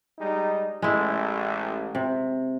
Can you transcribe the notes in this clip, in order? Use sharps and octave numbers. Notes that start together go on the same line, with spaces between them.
G3 G#3 D#4
A1 G#3 E4
C3